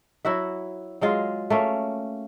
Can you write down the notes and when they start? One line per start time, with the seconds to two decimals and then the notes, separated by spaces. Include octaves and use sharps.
0.25 F#3 E4 F#4 E5
1.01 F#3 G#3 F4
1.50 A3 A#3 C#4